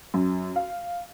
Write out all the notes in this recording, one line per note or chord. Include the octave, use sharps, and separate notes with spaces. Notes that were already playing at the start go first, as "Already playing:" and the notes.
F#2
F5